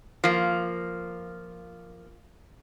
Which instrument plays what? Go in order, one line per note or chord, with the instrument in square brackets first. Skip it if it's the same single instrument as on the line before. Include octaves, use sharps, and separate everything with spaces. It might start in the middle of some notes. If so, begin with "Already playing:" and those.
[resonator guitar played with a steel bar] F3 A#3